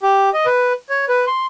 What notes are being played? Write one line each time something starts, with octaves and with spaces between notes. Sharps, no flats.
G4
D#5
B4
C#5
B4
C6